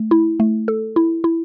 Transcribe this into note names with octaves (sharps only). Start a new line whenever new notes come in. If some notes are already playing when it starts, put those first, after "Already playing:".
Already playing: A3
E4
A3
A4
E4
E4